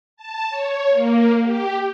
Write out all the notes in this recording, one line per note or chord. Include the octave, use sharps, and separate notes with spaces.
A5
C#5
A#3
G4